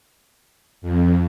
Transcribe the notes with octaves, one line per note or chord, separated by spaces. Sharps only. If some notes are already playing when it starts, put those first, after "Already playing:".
F2